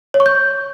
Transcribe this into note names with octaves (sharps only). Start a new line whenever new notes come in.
C#5
C#6
G6